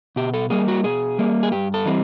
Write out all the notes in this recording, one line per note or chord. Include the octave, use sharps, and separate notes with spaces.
B2 G4
A4
G3 A#3 G#4
F#4
B2 G#4
G3 A#3
G#4
G2 G4
A4
E3 G3 C4